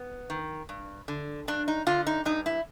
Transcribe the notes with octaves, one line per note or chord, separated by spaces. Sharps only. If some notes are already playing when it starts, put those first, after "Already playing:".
Already playing: B3
D#3
G2
D3
G2 D4
D#4
D3 F4
D#4
G2 D#4
E4